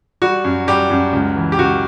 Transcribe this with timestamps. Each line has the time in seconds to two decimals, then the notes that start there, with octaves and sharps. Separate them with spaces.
0.22 G3 F#4
0.44 F#2
0.68 G3 G4
0.90 F#2
1.13 C#2
1.36 E3
1.52 G4
1.58 C#2 F#4